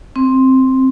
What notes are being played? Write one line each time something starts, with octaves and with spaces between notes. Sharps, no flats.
C4